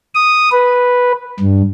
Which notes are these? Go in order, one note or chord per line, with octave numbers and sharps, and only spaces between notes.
D#6
B4
G2